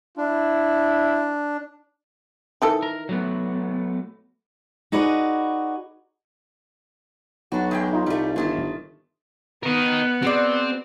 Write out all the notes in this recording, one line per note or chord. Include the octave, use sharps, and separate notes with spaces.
D4 E4
D#3 E3 A4
A#4
F#3 A3 B3
D#4 F#4 G#4 B4 D5
B1 D4 F#4
E2 G#3 G5
D#4 F4
C2 G3 A3
G1 A#2 D#3 A3
B3 A#4 D#5
C4 F#4 G#4 D5